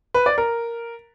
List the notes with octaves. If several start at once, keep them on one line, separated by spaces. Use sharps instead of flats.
B4
D5
A#4